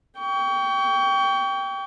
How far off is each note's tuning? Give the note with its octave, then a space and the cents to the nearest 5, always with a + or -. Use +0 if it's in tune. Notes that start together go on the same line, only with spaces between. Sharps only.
G5 +0 C#6 +35